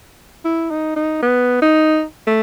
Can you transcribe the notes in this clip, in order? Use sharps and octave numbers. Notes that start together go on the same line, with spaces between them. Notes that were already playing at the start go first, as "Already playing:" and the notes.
E4
D#4
D#4
B3
D#4
A3